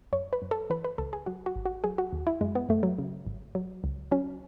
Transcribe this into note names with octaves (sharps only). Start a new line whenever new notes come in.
F#2 C#5
B4
F#2
A4
E3 B4
B4
C#2 A4
G#4
F#3 F#4
F#4
G#1
F#4
F#3 G#4
F#4
D#2
E4
F#2 G#3
B3
F#2 A3
F#3
C#3
G#1
F#3
C#2
F#3 C#4